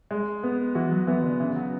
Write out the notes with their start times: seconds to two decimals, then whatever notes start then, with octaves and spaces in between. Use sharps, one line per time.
0.11 G#3
0.43 B3
0.75 E3 F#4
0.92 F#3
1.07 E3 B3
1.24 D3
1.40 C#3 E3
1.56 F#3